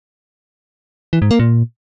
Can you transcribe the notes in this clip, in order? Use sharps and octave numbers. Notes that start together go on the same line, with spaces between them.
E3
G#2
A#3
A#2